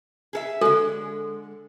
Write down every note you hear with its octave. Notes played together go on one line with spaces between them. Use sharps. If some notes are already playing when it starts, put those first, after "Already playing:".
G#4 A4 E5
D3 G#3 A4